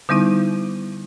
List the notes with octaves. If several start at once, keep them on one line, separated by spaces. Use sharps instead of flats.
D3 G3 B3 D#4 E4